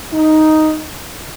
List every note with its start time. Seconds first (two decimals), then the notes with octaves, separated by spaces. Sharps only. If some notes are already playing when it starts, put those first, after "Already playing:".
0.13 D#4